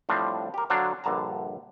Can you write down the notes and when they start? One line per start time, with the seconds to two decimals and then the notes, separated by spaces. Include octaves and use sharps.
0.09 A2 F3 G3 C4 D4
0.54 G4 A#4
0.70 D3 F#3 D4 C5 F5
1.04 A#1 G2 D3 A5 A#5